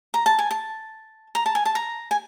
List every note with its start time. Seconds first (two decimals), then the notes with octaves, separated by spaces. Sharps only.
0.14 A#5
0.26 A5
0.39 G#5
0.51 A5
1.35 A#5
1.46 A5
1.55 G#5
1.65 A5
1.75 A#5
2.11 G#5